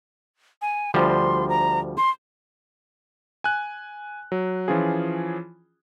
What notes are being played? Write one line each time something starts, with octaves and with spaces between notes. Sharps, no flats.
G#5
D2 F3 G3 C6
A#5
C6
G#5 F#6
F#3
E3 F3 C#4 F4 G#4